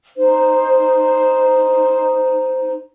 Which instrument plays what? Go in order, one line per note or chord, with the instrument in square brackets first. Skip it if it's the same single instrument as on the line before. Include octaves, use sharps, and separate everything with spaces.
[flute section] D#4 C5